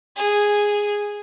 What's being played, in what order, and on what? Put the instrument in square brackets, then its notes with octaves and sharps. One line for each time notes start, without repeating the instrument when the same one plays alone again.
[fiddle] G#4